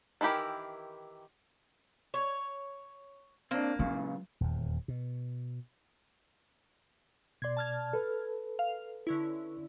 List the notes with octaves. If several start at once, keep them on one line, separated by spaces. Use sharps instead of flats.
D#3 E3 E4 G4 A#4
C#5
A#3 C4 D4
C#2 A#2 C#3 F#3
D#1 E2
B2
B2 D5 C6 G#6
A5 F6 G#6
A4 B4
F5
D3 C#4 E4